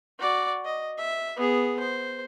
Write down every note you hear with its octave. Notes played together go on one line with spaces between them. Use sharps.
F#4 D5
D#5
E5
B3 G#4
C5